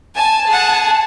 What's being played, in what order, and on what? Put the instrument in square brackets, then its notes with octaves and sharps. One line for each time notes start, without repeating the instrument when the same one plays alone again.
[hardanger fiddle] G#5 [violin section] A5
[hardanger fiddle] G#4 F#5